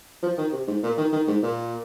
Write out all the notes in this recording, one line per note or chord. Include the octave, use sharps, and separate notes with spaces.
F3
D#3
C3
G#2
A#2
D#3
D#3
G#2
A#2